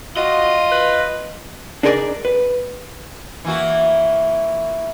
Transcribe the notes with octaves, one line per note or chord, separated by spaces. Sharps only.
F4 F#4 D#5
B4
D4 D#4 G#4 A#4 C5 D5
B4
E3 A#3 F#4